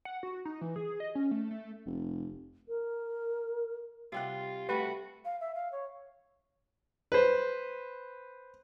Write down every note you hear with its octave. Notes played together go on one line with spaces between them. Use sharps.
F#5
F#4
D#4
E3
G#4
D#5
C#4
A3
A3
F1
A#4
C3 G3 F4 F#5
G3 A3 F#4 B4
F5
E5
F5
C#5
B4 C5